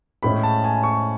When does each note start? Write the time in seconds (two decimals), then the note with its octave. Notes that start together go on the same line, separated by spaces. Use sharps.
0.23 A2 G#3 C#4 B5
0.43 A5
0.64 G#5
0.83 C#6